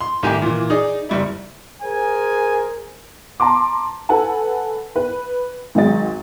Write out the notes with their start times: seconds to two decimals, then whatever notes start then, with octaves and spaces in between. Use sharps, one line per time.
0.01 C6
0.23 C2 A2 D#3 G4 G#5
0.42 A#2 E3
0.70 D#4 G#4 D5
1.09 F#1 G3 E4
1.82 G#4 A#4 C5 G#5
3.40 A5 A#5 C6 D6
4.09 A4 B4 F#5 G#5 A5
4.96 B4
5.75 G#1 D#3 F#3 G#3 D#5 A6